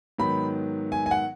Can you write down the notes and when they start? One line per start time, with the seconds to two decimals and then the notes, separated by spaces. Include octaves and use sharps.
0.19 G#2 D#3 F#3 B3 B5
0.92 G#5
1.06 G#5
1.11 F#5